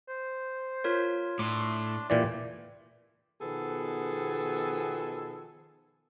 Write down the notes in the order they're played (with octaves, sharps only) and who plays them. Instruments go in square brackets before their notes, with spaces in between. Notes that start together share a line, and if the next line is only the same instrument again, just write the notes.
[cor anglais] C5
[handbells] F4 A#4 C#5
[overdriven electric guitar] A2 [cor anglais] D4 [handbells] C6 D6
[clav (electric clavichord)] A#2 E3 D5 [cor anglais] G4
[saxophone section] B2 D#3 F3 B3 G#4 A4